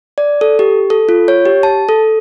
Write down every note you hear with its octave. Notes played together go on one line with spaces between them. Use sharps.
D5
A4
G4
A4
F4
C#5
G4
A5
A4